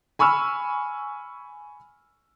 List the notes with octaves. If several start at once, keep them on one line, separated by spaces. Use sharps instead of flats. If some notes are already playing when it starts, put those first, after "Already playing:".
G#5 B5 C#6 E6 F6